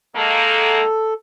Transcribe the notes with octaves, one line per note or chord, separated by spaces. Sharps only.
D#3 G#3 A#3 A4